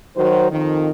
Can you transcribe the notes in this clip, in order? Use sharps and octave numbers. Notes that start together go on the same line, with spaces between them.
D#3 F#3 F#4 C5
F2 D#3